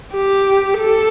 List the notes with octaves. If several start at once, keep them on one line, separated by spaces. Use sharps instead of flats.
G4
A4